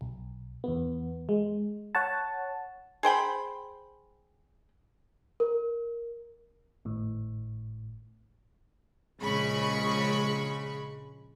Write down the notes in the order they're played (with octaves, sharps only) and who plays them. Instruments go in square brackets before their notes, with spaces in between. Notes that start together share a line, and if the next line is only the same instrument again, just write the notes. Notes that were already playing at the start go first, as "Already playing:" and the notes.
[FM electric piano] B1
E2 B3
G#3
C#5 F#5 A5
[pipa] G#4 C5 G5 B5
[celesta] A#4
[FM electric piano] G#1 A2
[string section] A#1 C#3 G#3 B5 C#6